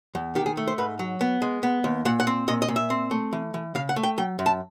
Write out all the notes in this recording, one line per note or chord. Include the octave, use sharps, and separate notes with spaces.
E2
D#3 G4
G#4
A3
C5
G#2 B4
F#3
B3
G#3
B3
D#2
A#2 F#5
F#5
C4
A#2 D#5
D#5
A#2
E5
C4
A3
E3
E3
C#3 F5
F#5
A3
G5
F#3 G5
F#2
A5